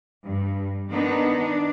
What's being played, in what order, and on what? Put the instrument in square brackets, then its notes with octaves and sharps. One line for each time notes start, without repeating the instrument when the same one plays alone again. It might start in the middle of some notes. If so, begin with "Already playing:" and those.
[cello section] G2
D#3 B3 D4 D#4
D4